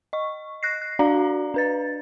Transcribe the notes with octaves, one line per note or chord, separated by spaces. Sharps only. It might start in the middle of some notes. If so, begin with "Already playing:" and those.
D#5 C#6
F#6 A#6 C7
F#6
D4 F#4 D5 F5 A#5
D4 B4 A6